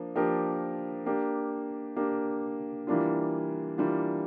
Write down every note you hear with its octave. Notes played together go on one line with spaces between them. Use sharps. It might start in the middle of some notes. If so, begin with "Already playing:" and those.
Already playing: F3 A#3 D4
F3 A#3 D4 G4 A#4
A#3 D4 G4
A#3 D4 G4
E3 G3 A#3 D4 F4
E3 G3 A#3 D4 F4